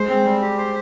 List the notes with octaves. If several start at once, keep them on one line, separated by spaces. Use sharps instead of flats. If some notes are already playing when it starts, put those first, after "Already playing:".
Already playing: G#3 C5
C4
G3
G4
C5